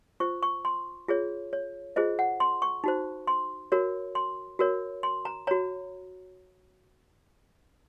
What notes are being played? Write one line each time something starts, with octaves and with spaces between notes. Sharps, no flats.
F4 C5 C#6
C#6
C6
F4 G#4 C#5
C#5
F4 G#4 C5 D#5
F#5
C6
C#6
D#4 F#4 C5
C6
F#4 A#4 C#5
C6
F#4 A#4 C#5
C6
A#5
F#4 C#5 A#5